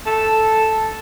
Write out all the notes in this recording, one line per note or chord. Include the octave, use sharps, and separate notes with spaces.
A4